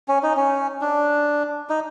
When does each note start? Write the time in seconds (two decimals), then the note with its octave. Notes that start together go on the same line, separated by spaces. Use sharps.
0.08 C#4
0.23 D#4
0.37 C#4
0.81 D4
1.70 D#4